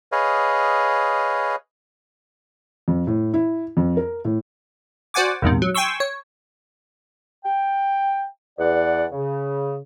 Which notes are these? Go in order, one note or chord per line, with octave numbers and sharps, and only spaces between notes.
G#4 B4 C#5 D#5 F5
F2
A2
E4
F2
A#4
A2
F#4 C5 D5 F#5 G#5 D6
A#1 E2 G#2 C3
F#3
G5 G#5 C6 C#6 E6
C#5
G5
E2 D5 F#5
C#3